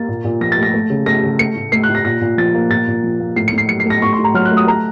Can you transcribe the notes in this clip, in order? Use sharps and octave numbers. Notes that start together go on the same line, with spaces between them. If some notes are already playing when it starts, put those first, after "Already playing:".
Already playing: A#3 A6
A#2
A#2
F3 A#6
A6
A3
A#6
A3
C#3
A3 A#6
C#3
A3 C#7
A2
A3 C7
F#6
A2
A#6
A#2 A#6
A#2
F3 A6
A#3
A#2 A6
A#2
F3
A#3
A2 C7
A2 C#7
C7
F#3 C#7
C7
A3 A#6
A2 C#6
C6
A2
A#5
F#3 F6
F#6
A3
D#6
A3 A#5